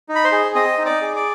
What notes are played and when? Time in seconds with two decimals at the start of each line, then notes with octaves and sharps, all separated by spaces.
0.09 D#4
0.15 B5
0.24 C5 C6
0.32 G#4
0.55 C4 D#5 D#6
0.78 D#4
0.86 D5 D6
1.01 G#4
1.16 D5 D6